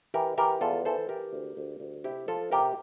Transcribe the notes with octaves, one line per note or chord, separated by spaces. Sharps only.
E3 G4 A#4
E3 G4 A#4
E2 F4 A4
E3 A4 C5
E3 G4 A#4
D2
D2
D2
C3 E4 G4
F3 F4 A4
C3 G4 A#4